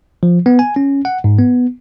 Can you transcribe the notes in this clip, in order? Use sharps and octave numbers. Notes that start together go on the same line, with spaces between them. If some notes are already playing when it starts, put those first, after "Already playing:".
F3
B3
G#5
C#4
F#5
G#2
B3